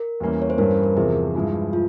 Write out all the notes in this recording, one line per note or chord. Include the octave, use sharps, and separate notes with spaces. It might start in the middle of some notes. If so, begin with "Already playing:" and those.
Already playing: A#4
E2 E3 G3 A#3 C#4
C#5
C5
G2 E3 G3 C#4 A#4
C5
A#4
E2 C3 F3 G#4
G2 F3 G#3 E4
F4